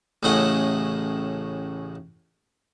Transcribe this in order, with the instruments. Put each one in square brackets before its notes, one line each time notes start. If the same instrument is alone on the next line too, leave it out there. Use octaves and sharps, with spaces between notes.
[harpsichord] A1 A2 C#3 E4 D#5 F#5